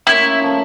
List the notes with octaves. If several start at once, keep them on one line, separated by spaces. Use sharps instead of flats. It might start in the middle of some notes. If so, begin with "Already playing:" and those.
A#3 C#4 E4 F4
C#3 F3 A3